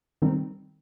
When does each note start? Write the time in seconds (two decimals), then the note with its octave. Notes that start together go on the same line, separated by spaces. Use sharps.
0.22 D#3 G3 C4 D#4